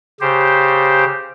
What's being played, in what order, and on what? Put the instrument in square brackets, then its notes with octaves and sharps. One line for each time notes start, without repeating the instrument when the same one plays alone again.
[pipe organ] C#3 G4 C5